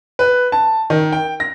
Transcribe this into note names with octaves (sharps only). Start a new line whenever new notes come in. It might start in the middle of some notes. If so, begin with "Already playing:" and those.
B4
A5
D#3
G5
A#6